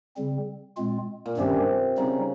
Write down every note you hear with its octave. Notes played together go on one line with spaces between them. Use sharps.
C#3 G3 C4
A#2 G#3 C4 F4
A#2
G2 C3 D#3 G3 C#4 G4
C#3 G3 C4 D#4